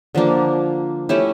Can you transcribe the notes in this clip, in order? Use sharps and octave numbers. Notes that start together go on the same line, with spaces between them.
D3 F3 A#3 D4
A3 C#4 E4 G4